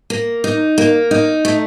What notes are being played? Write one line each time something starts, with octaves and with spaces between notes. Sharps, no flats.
A#3
D#4
A#3
D#4
A3